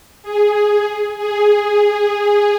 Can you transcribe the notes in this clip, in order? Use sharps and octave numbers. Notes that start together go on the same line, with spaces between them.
G#4
G#4